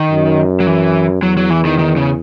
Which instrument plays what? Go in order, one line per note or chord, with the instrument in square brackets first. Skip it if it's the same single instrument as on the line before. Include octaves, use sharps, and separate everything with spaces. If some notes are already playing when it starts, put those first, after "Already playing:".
Already playing: [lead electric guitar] D#3
[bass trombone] F#2
[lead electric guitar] F#3
E3
[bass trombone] E2 [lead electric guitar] F#3
[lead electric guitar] F#3
E3
D#3
D#3
C#3